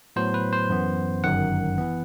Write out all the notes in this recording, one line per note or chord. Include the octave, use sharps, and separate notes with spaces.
A2 F#3 B3 C5
B4
C5
F#2 E3 B3
G1 F#2 D#3 F#5
E3 B3